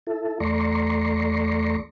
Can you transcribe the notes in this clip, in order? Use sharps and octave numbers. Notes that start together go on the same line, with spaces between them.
E4 A4
E2 A3 D5 A#5 C6 C#6